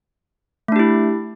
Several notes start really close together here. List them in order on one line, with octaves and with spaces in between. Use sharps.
A3 D4 G4 E4